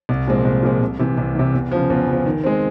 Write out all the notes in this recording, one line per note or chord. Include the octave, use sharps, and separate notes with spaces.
C2
A#2 F3 G#3 C4
C2
A#2 F3 G#3 C4
C2
C3 E3
C2
C3 E3
E2
C#3 F3
E2
C#3 F3
D#3
G#3 C4